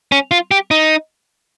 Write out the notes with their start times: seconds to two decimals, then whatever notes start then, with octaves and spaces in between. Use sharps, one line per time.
0.12 C#4
0.31 F4
0.51 G4
0.71 D#4